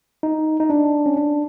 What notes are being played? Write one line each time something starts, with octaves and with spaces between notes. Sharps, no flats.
D#4
D#4
D4
C#4
D4